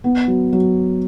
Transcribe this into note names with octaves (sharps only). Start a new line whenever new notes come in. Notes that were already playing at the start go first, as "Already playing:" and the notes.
B3
F#3
F#3